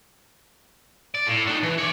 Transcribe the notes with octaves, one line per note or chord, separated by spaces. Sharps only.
D5
A2
D4 D#4
E3
C#5 D5